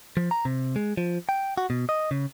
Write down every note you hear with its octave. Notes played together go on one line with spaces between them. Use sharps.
F3
A#5
C3
G#3
F3
G5
F#4
B2
D#5
C#3